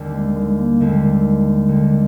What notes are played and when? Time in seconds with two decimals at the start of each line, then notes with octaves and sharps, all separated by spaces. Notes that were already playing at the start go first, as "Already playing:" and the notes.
Already playing: D#2 D3 G3 C4
0.14 G#3
0.36 G#3
0.58 A#3
0.80 D#2 D3 G3 G#3 C4
1.68 D#2 D3 G3 C4